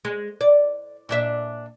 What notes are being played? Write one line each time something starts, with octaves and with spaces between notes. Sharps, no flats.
G#3
D5
A#2 D4 E5